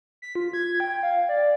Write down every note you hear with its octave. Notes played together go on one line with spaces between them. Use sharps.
B6
F4
G#6
G5
F5
D5